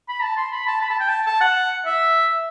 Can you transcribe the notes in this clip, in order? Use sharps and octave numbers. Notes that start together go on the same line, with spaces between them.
B5
A5
C6
B5
A5
B5
A5
G5
A5
A5
F#5
E5